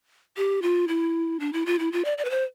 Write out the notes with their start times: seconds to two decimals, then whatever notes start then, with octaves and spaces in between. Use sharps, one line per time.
0.37 G4
0.62 F4
0.88 E4
1.40 D4
1.53 E4
1.66 F4
1.79 E4
1.92 F4
2.05 D5
2.18 D5
2.25 B4
2.30 C5